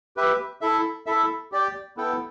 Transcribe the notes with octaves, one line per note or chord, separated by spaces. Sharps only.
G4 B4 E5
E4 A4 E5
E4 A4 E5
G4 D5 G5
B3 E4 A4 G5